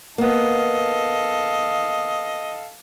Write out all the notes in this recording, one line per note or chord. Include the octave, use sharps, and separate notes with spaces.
A#3 B3 A4 D#5 F5